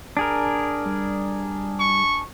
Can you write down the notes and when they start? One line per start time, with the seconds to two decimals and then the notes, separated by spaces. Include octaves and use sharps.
0.17 D4 G#4 A#4
0.86 G3
1.80 C#6